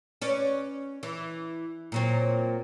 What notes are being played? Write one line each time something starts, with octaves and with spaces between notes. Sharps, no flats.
C#4 B4 D5
E3
A#2 F#3 C4